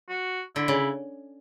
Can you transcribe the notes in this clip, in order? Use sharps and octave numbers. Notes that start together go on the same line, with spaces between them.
F#4
D3 E4
C#3